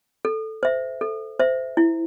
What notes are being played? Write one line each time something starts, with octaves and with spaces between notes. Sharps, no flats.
A4
C5 E5
A4
C5 E5
E4